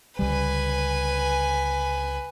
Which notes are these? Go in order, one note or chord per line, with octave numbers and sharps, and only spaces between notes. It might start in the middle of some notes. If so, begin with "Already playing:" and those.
C#2 D3 G3 B4 G#5